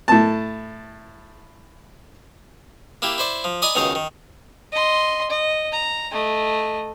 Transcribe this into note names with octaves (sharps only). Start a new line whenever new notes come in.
A2 A5
A#3 E4 G4
E4 C5 D5
F3
D5 D#5 G#5 A#5 B5
C#2 B2 D#3 D#4 A#4 F5
D#3
D#5 C6
D#5
A#5
A3 D#5